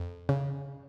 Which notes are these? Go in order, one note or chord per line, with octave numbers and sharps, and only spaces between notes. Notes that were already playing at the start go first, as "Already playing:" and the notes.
Already playing: F2
C#3